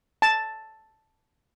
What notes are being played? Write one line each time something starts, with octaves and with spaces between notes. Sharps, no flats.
A5